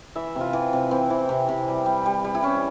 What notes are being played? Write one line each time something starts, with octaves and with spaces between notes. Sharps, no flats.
E3 E5
C3
F4
E3
C3
E3 C4
E3
C3
C3
G3
G3
G3
G3
E4
G3 C#4